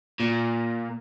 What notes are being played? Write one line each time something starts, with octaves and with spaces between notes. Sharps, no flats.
A#2